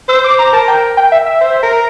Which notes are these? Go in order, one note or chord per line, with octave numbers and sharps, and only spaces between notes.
C5 E6
D6
A#5
A#4 A5
G5
G5
E5
E5
C5
A#4